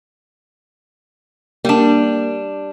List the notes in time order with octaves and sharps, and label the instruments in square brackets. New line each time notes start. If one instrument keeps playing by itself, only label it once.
[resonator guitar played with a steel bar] G3 D4 [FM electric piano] A#3